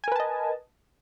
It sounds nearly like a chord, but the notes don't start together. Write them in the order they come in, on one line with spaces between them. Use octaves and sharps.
G#5 A#4 B4 A5 D#5